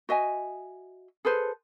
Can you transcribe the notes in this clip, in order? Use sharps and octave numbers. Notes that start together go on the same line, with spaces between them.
F#4 D#5 E5 G#5
G#4 A4 B4 C5